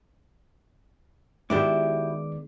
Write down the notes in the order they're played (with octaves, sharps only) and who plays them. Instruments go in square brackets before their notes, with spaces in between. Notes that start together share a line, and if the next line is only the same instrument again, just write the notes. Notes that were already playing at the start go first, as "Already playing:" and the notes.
[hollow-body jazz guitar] D#3 G#3 B3 [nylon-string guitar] E4 F#4 G4 [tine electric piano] D5 D6